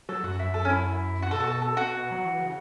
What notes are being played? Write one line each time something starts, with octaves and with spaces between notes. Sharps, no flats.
F#3 A4
F#2 F#4
F#2 E4
F#2 A4
C#4
E4
F#4
B2 A4
F#4
A4
A4
F#4
F#3
E3
C#3